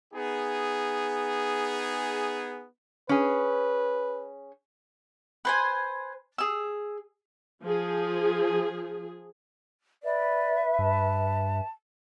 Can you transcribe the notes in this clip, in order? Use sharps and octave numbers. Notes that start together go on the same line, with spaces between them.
B3 D#4 G#4
C#4 G#4 B4
B4 C5 G#5
G#4 E6
F3 G#4
B4 D5 E5
G2 A5